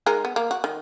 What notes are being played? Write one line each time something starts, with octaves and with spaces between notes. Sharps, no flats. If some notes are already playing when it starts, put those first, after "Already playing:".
G#3 D#4 A#4
B3
A#3
F#4
D#3